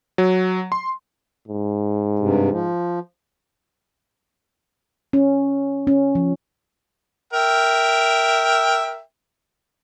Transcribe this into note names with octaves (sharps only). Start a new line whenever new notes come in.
F#3
C6
G#2
G2 C3
F3
C#4
C#4
F3
A#4 E5 G5